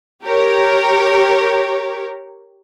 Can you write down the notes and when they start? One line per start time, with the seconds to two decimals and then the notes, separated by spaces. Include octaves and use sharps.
0.24 G4 A#4 C#5